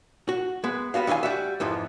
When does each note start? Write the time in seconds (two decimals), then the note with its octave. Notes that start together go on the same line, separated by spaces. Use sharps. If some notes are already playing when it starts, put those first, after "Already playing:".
0.29 F#4
0.64 G#3 B3
0.94 G3 B3 F#4 F5
1.07 D#3 E3 E5 F5 G#5
1.23 G3 F#4 E5
1.60 F2 G#2 E3 F3